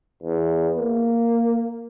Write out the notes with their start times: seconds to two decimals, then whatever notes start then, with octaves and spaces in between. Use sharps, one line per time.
0.23 E2
0.78 A#3